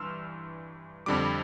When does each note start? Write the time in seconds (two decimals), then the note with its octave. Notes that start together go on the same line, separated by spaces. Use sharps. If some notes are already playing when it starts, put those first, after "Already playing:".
Already playing: G2 E3 C6 E6 F6
1.06 F2 D3 G3 D6